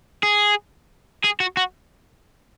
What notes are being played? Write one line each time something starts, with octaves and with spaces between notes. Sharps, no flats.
G#4
G#4
F#4
F#4